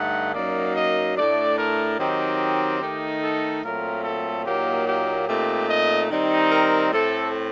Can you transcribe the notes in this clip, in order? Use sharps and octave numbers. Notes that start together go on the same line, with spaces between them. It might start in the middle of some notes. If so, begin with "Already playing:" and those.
Already playing: G2 D3 A3 D#4 F#5
F#2 F#3 A#3 D#4 D5
D#5
A2 A3 D4 D5
A#4
D#3 F#3 C4 D#4 G4
D#3 A3 D#4
A4
A#2 F#3 A3 C4 A#4
A4
A#2 F#3 A#3 D#4 G4
G4
A#2 A3 C4 D#4 G4
D#5
D#3 G3 C4 D#4
A#4
A2 A3 C4 A4